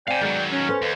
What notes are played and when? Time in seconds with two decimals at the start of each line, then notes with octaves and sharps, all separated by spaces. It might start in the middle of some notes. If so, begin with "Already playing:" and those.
0.08 C4 D5 F5 G5 G#5
0.21 D#3 F#3 G#3 B3
0.51 C#4
0.69 A4 B4 C5
0.82 D#2